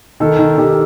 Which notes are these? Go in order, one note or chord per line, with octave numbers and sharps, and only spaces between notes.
D#3 A4
D#3
D#3 G4